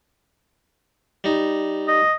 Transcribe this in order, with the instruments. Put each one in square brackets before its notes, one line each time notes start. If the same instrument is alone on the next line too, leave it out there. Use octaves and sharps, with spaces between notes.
[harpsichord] G3 D#4
[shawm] D#5